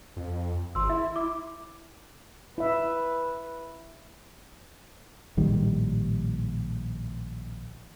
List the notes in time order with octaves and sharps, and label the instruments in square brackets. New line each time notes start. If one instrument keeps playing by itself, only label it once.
[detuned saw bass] F2
[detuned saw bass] G#1 [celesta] C6 E6
[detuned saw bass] E4 [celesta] E5
[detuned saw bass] E4 [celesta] D6
[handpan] E4 E5 [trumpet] B4
[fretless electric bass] A#1 A2 D#3 G3